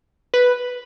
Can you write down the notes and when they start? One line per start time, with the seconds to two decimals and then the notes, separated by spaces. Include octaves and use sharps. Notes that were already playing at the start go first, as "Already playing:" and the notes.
0.34 B4